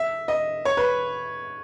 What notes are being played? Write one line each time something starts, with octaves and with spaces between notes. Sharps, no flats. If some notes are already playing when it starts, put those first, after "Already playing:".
Already playing: E5
D#5
C#5
B4